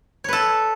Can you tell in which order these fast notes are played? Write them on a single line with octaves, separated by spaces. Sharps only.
C#5 B4 A4